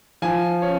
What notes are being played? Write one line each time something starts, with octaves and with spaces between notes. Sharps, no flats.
F3 G#5
C#4